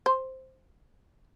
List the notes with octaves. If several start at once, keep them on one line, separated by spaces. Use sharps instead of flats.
C5